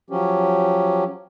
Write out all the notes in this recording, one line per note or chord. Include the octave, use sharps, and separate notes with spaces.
F3 F#3 C#4 G4